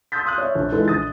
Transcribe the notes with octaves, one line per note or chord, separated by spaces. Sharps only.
C6 D#6 E6 G6 A6 B6
C6 D#6 F6 F#6
C#5 E5
A#1
E3 G#3 D#4 F4 A4 B4
A#1 D#6 A6